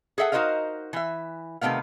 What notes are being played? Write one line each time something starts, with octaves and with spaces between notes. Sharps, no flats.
G#4 A4 E5 F#5
D#4 F#4 A#4 C5 D#5 F5
E3 E5
C3 D#3 A3 B3 F5